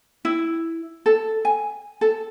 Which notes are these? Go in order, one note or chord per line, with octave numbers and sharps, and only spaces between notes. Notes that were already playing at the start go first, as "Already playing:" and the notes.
E4
A4
G#5
A4